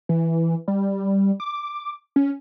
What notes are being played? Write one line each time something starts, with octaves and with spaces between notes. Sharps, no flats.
E3
G3
D6
C#4